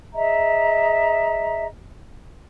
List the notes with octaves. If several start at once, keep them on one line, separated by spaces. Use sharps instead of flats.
G#4 D#5 E5 A#5